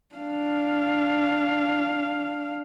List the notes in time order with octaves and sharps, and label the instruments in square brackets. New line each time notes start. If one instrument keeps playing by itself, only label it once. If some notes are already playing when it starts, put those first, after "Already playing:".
[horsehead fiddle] D4 F5